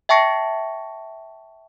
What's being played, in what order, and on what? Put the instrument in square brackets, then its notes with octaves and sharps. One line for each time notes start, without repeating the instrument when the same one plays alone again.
[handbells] E5 G5 A5 C#6 A#6 C#7